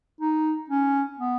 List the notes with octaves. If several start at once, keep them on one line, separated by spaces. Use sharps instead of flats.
D#4
C#4
B3